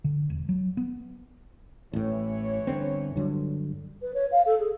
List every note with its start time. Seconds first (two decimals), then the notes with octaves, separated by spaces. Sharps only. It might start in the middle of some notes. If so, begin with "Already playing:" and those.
0.04 D3
0.30 E1
0.49 F#3
0.77 B3
1.93 A1 A2 E3 C#5
2.67 G1 D3 C4
3.16 G2 D3 F#3
4.02 B4
4.14 C#5
4.32 F5
4.46 A4
4.59 G#4